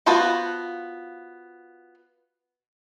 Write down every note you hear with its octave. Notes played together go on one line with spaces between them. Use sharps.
B3 F4 F#4 C5 A5